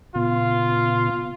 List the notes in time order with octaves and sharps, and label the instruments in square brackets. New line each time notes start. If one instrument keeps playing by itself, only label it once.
[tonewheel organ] A#2 C#3 B3 [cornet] F4